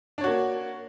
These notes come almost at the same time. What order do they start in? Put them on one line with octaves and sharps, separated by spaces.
D4 C#5 F#4 A#3